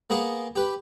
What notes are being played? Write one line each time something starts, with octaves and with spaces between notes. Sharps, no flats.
A#3 B3 G#4 A#4 F5 C#6
G4 B4